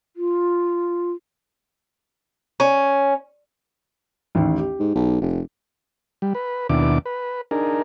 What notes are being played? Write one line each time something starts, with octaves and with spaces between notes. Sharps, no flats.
F4
C#4
A1 D#2
G4
G#2
B1
F1
G3
B4
D#2 B2 D4 E4 D6
B4
D4 D#4 G#4 A#4